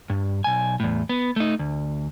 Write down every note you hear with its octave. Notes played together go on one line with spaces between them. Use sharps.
G2
B1 G#5
E2 A2
B3
A3 D#4
D2